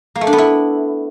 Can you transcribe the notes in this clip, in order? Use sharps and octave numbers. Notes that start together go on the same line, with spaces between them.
A#3
A3
D4
B3
E4